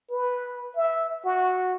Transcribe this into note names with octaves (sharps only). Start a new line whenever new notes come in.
B4
E5
F#4